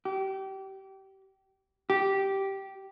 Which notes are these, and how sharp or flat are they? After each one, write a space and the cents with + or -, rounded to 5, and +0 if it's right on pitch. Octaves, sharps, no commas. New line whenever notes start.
G4 -25
G4 -10